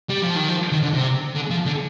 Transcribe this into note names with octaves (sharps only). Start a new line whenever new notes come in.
G3
F3
D#3
F3
D#3
D3
C3
D3
F3
D3